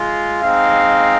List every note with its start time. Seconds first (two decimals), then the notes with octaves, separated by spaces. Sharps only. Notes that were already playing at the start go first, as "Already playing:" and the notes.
Already playing: G#3 F4
0.43 G#3 C4 D#4 F5